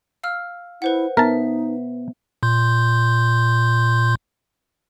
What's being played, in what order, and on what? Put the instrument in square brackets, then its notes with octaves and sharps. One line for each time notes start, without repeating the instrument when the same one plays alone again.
[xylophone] F5 E6 F6
[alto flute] E4 [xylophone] B4 C5 F#5
[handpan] B3 [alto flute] D#4 [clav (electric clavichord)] A#4 A5 [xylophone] E5
[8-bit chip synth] A#2 C6 G6